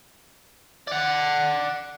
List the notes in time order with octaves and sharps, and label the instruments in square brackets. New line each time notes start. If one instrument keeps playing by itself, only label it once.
[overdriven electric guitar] D5 F#5